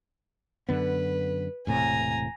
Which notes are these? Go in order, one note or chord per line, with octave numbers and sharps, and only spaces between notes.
F#2 D3 B3 B4
E1 A2 C3 G#5 A#5